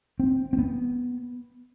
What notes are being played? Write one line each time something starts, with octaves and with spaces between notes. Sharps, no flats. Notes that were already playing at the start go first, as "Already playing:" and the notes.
C4
C4
B3